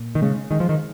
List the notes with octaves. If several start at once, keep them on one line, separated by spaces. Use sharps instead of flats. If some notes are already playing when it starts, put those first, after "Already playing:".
Already playing: A#2
D#3
C#3 G#3
D#3 G#3
F3
D#3